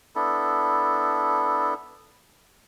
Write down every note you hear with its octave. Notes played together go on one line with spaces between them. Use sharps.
B3 D4 E4 A4